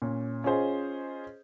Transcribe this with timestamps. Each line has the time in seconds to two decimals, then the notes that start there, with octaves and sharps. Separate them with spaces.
0.02 A#2 C#4
0.44 C#4 F4 G#4 C5 D#5